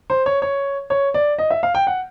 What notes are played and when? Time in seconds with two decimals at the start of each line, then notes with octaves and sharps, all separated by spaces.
0.10 C5
0.26 C#5
0.42 C#5
0.90 C#5
1.14 D5
1.38 D#5
1.50 E5
1.63 F5
1.75 G5
1.87 F#5